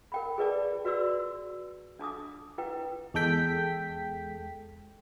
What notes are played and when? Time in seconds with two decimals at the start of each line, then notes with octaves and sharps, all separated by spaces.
0.12 A#4 G5 B5
0.38 G#4 B4 D5 A5
0.85 F#4 B4 D5 C6 E6
1.99 D4 A5 D6 D#6
2.58 E4 B4 G5
3.14 E2 G#3 A4 G5 B6